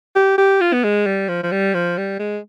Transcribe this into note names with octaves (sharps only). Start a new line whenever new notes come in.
G4
G4
F4
B3
G#3
G3
F3
F3
G3
F3
G3
G#3